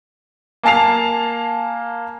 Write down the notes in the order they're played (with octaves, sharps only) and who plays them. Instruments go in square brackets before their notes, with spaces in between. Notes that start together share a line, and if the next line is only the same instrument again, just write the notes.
[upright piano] A#3 G#5 A5 C7 F7